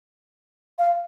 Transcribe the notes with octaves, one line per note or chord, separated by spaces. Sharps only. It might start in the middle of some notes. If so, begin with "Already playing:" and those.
F5